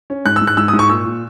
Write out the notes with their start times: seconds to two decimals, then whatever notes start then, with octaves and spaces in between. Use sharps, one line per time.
0.10 C#4
0.26 G#2 F#6
0.36 E6
0.42 G#2
0.47 F#6
0.57 G#2 E6
0.68 D#6
0.73 G#2
0.79 C#6
0.90 A#2 E6
1.05 A#2